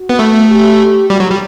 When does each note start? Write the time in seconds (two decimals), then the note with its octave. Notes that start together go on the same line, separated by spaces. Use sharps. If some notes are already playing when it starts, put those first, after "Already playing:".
Already playing: F#4
0.09 B3
0.19 A3
0.50 G4
1.10 G3 F#4
1.20 F#3
1.31 G3